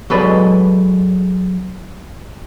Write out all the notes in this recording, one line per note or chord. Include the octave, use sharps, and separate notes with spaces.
F#3 G#3 A4 B4 D5 D#5